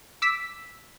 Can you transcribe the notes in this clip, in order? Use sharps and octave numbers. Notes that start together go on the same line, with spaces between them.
D6 E6 B6